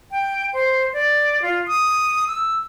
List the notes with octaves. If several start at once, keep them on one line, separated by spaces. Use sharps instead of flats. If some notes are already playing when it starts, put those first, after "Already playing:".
G5
C5
D5
F4
D#6
E6